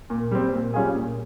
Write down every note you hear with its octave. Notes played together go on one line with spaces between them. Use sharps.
A#2
G3 C4
A#2
G3 C#4 F4 G#4
A#2